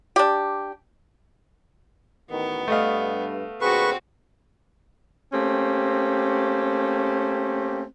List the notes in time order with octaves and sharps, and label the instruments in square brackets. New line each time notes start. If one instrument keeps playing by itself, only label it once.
[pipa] D4 G4
[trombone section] A1 D#3 [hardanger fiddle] B3
[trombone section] G2 [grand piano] A3 D#5 F5
[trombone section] D2 A#2 G#4 [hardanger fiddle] C4 F#4 [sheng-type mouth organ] B4 C#6
[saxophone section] A3 A#3 C4 C#4 G4